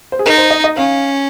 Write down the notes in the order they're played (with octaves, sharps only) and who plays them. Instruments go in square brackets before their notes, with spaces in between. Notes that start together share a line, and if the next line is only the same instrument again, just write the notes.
[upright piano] C5
G#4
[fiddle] D#4 [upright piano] A#4
[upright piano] C5
D#5
D#5
[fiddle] C#4 [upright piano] F5